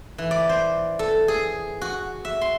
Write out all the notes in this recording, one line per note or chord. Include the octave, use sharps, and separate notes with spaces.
E3
D5
C5
A4
G#4
F#4
E5
C6